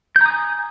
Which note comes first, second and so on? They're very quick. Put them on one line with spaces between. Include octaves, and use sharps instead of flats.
G6 A#5 D#6 G#5